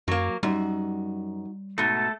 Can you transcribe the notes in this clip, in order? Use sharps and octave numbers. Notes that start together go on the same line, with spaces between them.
F#2 F#3 A#3
F#2 G3 D#4 F#4
G#2 B2 A3 A4